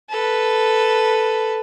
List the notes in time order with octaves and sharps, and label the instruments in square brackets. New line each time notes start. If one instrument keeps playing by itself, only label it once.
[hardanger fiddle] A4 B4